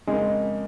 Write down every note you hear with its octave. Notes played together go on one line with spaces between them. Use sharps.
F2 C#3 G#3 A#3 D#4